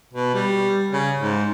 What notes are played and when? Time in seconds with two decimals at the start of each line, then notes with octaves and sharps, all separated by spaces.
0.13 B2
0.34 G3
0.92 C#3
1.20 G#2